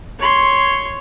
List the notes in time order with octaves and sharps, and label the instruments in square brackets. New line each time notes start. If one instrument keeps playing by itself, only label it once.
[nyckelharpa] C#5 C6